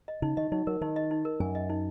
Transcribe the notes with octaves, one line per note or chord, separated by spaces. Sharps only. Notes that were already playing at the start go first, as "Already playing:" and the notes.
D#5
C#3 D#4
D#3 D#5
F#3 D#4
F#3 A#4
D#3 D#4
D#5
D#4
A#4
F#2 G#5
D#5
D#4